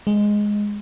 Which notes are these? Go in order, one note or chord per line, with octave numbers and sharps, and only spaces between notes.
G#3